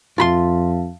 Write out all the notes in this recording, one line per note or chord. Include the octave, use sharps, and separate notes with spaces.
F2 F4 E5 F5 A5 B5 C6